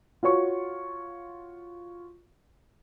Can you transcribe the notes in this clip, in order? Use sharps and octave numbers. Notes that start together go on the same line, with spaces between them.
F4 F#4 C#5 C#6